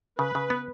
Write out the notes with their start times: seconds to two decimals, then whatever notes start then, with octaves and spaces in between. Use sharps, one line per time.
0.19 C#3 B4
0.35 C#3
0.50 B3